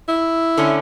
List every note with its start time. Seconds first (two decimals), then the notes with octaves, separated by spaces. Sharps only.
0.08 E4
0.57 D3 A3 C#4